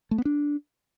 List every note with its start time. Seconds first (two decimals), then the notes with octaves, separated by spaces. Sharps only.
0.11 A3
0.18 B3
0.25 D4